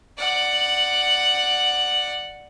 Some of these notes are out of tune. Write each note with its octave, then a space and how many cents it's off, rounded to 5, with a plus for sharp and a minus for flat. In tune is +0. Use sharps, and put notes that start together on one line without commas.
D5 +10 F#5 +0